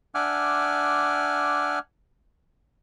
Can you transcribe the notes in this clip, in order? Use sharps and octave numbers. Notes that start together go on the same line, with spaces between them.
D4 E5 F#5 G#5 D6 F6